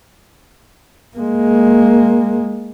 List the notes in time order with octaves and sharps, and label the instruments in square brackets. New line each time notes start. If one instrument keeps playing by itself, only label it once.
[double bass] G#3 A#3